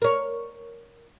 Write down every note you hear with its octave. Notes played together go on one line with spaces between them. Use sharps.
A#4 C#5